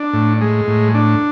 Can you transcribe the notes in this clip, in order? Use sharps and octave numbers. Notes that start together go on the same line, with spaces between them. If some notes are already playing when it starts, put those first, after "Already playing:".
Already playing: D4
A2
G#3
A2
D4